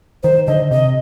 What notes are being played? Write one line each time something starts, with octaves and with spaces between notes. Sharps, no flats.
D#3 C5
D3 D#5
C3 D#5